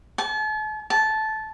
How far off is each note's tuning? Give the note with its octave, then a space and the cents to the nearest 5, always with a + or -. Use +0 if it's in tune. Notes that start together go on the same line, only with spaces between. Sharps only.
A5 -40
A5 -15